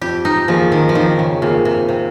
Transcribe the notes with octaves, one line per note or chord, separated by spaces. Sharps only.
F2 G4
D#4
D#3 F3 A#3 F4 G#4
D#3
F3
F2 D#3
C#3
C3 D#3 A#3 F4 G#4
C3
C3